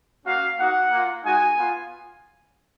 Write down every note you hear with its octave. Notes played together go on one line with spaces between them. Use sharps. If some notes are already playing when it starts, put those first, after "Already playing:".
A#3 C#4 F#4 F5
A#3 D#4 F#4 F#5
A#3 F4
G#3 D#4 F#4 G#5
B3 F4